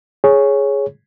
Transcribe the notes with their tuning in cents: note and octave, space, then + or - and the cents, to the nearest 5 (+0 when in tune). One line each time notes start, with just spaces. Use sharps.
G#4 +0 C#5 +0